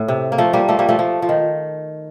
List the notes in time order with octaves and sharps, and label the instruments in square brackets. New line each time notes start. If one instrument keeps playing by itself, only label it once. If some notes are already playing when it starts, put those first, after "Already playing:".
Already playing: [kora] A2
C3
A#3
F3 A3
G3 A#3
F3 A3
G3 A#3
F3 A3
F3
F3
D#3